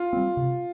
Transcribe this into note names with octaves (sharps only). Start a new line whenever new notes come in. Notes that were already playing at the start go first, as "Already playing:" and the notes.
Already playing: F4
G3 C4
C3